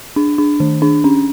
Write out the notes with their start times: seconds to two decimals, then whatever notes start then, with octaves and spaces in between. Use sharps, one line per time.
0.16 D4
0.38 D4
0.60 D#3
0.82 D4
1.04 C#4